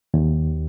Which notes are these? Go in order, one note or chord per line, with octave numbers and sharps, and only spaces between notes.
D#2